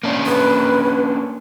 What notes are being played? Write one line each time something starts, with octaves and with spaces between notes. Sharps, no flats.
A#3 C#4 D4
B4